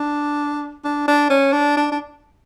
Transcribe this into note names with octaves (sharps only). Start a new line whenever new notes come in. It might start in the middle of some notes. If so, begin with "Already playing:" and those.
Already playing: D4
D4
D4
C#4
D4
D4
D4